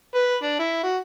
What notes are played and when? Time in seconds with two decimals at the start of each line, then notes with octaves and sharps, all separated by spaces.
0.15 B4
0.43 D4
0.59 E4
0.83 F#4